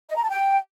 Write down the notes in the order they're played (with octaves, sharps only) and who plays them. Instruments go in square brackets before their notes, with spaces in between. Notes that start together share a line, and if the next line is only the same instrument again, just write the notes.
[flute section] D#5
A#5
A5
G5